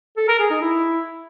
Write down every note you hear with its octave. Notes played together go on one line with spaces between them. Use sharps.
A4
A#4
G#4
D#4
E4